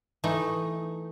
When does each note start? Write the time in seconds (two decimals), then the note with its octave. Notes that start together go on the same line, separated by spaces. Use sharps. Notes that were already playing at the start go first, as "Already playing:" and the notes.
0.24 E3 A3 D#4